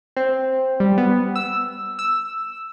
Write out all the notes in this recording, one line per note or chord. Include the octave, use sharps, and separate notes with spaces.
C4
G3
B3
E6
E6